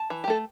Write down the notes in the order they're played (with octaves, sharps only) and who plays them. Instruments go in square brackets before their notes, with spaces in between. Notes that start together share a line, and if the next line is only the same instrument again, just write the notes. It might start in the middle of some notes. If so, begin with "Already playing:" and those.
Already playing: [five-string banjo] A5
E3
G4
A3 A4